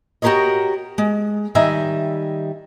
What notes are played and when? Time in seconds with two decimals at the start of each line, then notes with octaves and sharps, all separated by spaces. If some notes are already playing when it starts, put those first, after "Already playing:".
0.22 F#4 G4 A#4 B4 C#5 D#5
0.98 G#3
1.55 D#3 G3 D#5 E5 G#5